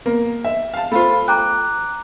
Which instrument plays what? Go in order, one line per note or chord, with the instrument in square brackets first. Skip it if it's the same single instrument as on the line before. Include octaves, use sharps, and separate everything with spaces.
[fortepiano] A#3
E5
F5 A5
[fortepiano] A3 F4 [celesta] C5 F5 B5
[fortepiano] G5 [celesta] A#5 D6 F#6